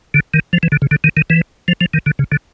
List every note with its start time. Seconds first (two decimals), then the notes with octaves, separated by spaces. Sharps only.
0.14 D3
0.34 D#3
0.53 F3
0.63 E3
0.72 D3
0.82 C#3
0.91 D3
1.04 D#3
1.17 D#3
1.30 E3
1.68 F3
1.81 F3
1.94 D#3
2.06 D3
2.19 C#3
2.32 D3